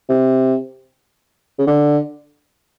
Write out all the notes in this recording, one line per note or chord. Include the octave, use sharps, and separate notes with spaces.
C3
C#3
D3